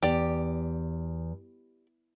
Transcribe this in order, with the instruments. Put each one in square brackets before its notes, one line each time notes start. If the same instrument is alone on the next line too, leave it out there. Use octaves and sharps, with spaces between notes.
[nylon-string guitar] E2 [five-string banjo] G4 D5